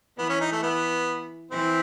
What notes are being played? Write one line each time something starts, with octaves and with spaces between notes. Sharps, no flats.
E3 B3
C#4
D#4
A3
B3
E3 C4